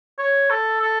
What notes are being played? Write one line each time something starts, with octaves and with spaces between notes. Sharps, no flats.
C#5
A4
A4